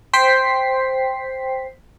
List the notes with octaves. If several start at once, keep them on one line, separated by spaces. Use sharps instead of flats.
C5 G5 B6 C7